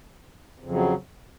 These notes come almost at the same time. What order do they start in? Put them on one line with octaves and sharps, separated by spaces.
F2 C#3 F#3